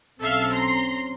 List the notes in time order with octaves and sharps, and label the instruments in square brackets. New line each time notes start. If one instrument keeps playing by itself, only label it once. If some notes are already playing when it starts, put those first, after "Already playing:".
[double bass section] B1 C4 C#4 [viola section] A4 E5 F5
[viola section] A#5 C6